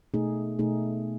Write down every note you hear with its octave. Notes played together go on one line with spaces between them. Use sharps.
B2 A3 D#4 G#4
B2 A3 D#4 G#4